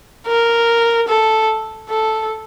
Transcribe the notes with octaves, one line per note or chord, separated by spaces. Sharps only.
A#4
A4
A4